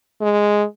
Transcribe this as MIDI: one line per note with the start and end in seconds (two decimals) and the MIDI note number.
0.21 0.64 56